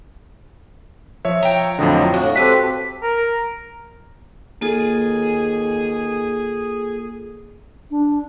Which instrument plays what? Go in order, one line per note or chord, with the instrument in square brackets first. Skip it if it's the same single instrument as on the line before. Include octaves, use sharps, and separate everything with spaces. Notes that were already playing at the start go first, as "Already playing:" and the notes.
[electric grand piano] F3 C#5 E5
[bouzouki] G5 A#5
[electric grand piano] F2 A2 D3 [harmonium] F3 F#3 D#5
[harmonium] A2 [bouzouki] D4 [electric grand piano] F#4 F5
[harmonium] C4 G4 A4 [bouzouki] B4
[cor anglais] A#4
[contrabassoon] D#2 [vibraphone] A#3 F4 A4 [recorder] G#4
[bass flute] D4